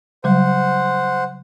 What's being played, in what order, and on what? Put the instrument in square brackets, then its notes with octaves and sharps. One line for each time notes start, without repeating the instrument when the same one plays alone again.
[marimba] C#3 F#3 G3 [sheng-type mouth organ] C5 F#5